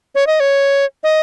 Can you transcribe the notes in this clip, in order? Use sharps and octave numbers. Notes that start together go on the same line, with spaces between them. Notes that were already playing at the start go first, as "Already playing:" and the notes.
C#5
D#5
C#5
D#5